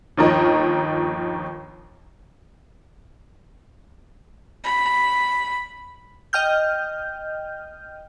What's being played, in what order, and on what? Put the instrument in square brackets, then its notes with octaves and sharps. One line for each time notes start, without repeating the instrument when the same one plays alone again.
[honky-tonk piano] G1 D#2 F3 A#4 D#5
[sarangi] B5
[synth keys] D#5 G5 F6 G6